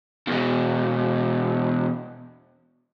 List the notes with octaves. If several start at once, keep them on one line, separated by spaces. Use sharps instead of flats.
E2 B2